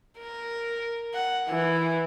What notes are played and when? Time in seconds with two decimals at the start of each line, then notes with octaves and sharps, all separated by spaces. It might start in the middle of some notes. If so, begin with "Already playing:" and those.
0.19 A#4
1.14 F#5
1.48 E3